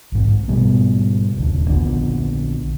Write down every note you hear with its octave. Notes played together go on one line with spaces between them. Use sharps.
A#1 G#2
G#2 B2 G3 B3
D#1 C#2 D3
A#1 D3 B3